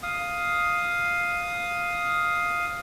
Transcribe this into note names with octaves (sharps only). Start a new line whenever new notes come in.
F5 D#6